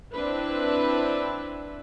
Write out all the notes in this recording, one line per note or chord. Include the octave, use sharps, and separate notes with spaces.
C4 D4 E4 B4